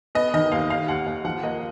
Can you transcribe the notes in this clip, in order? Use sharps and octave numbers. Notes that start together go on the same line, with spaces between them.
B3 D#5
D#3 D#5
D#2 F5
D#2 F5
D#2 F#5
D#2 F#5
F3 F#5
A#3 D#5